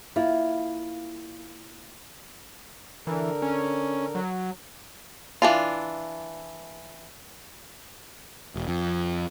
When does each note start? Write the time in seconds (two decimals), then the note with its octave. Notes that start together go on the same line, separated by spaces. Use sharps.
0.16 A#3 E4 F4
3.07 D3 E3 A#4
3.42 C#4
4.15 F#3
5.42 E3 D4 F4
8.55 E1
8.68 F2